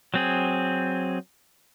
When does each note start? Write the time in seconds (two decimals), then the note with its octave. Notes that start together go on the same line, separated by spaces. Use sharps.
0.14 F#3 C4 G#4